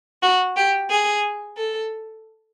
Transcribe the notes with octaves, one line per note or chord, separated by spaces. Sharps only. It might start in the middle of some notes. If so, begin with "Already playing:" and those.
F#4
G4
G#4
A4